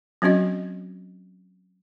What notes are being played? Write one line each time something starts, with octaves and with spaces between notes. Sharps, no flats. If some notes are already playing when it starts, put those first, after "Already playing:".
F#3 C4 C#4 F#4 D#5